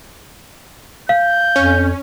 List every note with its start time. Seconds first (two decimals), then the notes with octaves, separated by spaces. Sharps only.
1.09 F5 G6
1.56 F2 C#4